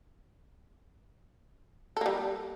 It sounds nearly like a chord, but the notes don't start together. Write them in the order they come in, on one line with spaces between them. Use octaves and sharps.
A4 A#3 G3